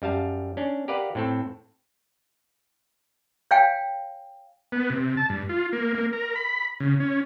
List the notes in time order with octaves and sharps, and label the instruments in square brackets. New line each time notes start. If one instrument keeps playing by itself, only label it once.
[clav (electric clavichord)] F#2 G3 F5 A5
C#4 D4
G4 A#4 B4 D5 F5 F#5
A2 C4 A4
[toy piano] C#5 F5 G5 G#5
[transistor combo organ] B3
C3
A5
G2
F4
A#3
A#3
A#4
B5
C#3
C#4